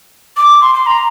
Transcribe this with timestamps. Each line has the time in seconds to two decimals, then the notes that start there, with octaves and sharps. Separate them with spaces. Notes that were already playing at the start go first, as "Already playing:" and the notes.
0.37 D6
0.61 C6
0.75 C6
0.86 A#5